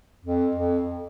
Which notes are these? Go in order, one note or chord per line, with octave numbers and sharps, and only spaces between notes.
F2
F2